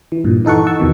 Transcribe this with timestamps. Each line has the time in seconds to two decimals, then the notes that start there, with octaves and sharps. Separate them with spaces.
0.12 E3
0.24 G2 A#2
0.45 E3 D#4 A4 F#5 C#6
0.67 F#5 A5 C#6 E6
0.80 E2 B2 D#3